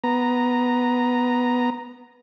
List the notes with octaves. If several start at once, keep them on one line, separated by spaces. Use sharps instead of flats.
B3 A#5